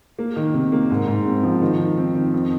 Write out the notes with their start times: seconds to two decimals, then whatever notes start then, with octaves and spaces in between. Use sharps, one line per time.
0.19 A#3
0.36 D#3
0.54 C3
0.72 A#3
0.90 G#2
1.07 G#2
1.25 C4
1.43 F3
1.62 D#3
1.79 D#3
1.97 C4
2.15 D#3
2.34 F2